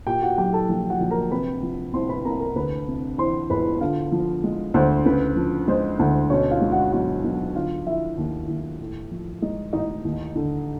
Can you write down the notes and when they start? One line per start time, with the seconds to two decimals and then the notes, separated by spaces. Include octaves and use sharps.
0.06 A#2 G4 G5
0.22 F#4 F#5
0.38 F#3 G4 G5
0.53 A4 A5
0.69 A#1
0.90 F#4 F#5
1.00 A#1
1.11 A#4 A#5
1.31 C3 B4 B5
1.63 F3
1.93 C2 C5 C6
2.09 B4 B5
2.25 C2 A#4 A#5
2.40 A#4 A#5
2.56 D2 B4 B5
2.88 C3
3.18 E3 C5 C6
3.50 E1 B4 B5
3.80 D3 F4 F5
4.12 F3
4.44 G#3
4.74 D2 C5
5.06 C#3 B4
5.36 F3
5.68 G#3 C5
5.99 D2
6.30 B2 C#4 C#5
6.51 F4 F5
6.61 G#3
6.72 F#4 F#5
6.92 B1 F#4 F#5
7.24 B1
7.55 D3 F4 F5
7.86 F3 E4 E5
8.18 D#2
8.48 D#2
8.80 A2
9.11 F3
9.42 G#3 D#4 D#5
9.73 A1 D#4 D#5
10.05 D#2
10.36 D3